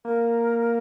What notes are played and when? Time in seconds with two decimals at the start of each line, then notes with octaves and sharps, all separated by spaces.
0.05 A#3 A#4